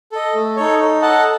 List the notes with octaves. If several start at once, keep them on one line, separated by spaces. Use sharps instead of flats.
A4 D#5
A3
D#4 A4 C#5
D#4
A4 D#5 F#5 A5